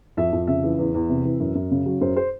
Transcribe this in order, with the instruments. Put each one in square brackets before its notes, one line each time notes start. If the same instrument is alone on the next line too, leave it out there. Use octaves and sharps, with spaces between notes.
[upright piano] F2 E5
F2
C#3 E5
E3
E2
E2
C3
E3
F#2
F#2
C#3
F#3
F#2 C5
C5